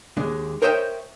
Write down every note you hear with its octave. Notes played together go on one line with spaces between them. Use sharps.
D#2 G#3 D4
A#4 C5 C#5 D#5 E5 G5